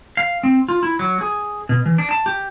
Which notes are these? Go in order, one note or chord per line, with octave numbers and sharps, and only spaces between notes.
F5
C4
F4
E4
F#3
G#4
B2
E3
D4
A5
G4